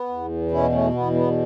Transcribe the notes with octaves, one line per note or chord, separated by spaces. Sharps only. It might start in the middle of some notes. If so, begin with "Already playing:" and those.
Already playing: B3
E2
B2 C#4 E4
A3 C#4
E2 B3
B3